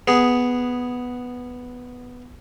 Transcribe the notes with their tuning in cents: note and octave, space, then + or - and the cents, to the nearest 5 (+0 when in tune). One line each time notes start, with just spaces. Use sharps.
B3 +0 G#4 +0